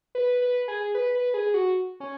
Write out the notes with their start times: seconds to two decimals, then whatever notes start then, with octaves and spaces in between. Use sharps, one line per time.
0.15 B4
0.42 B4
0.68 G#4
0.95 B4
1.15 B4
1.34 G#4
1.54 F#4
2.00 C#4